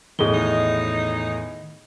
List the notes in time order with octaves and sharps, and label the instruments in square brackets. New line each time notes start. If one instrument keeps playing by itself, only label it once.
[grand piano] E2 A2 [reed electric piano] D#3 D#5 [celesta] G#4 G7
[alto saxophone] D#4